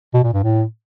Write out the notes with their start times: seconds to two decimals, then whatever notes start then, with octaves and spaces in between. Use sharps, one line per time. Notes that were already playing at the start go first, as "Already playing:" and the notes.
0.14 B2
0.24 A#2
0.34 G2
0.43 A2